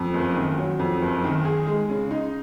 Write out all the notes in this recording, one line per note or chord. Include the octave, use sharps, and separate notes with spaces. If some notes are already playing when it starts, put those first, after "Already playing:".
Already playing: F2
F#1
D#3
F#3
F2
F#1
D#3
G#4
G#3
C#3
D#4